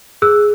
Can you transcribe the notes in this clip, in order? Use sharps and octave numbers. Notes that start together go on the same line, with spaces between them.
G#4 E6 F#6